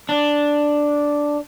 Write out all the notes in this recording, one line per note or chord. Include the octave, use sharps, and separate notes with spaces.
D4